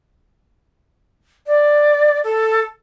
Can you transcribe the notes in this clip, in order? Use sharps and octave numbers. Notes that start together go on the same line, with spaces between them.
D5
A4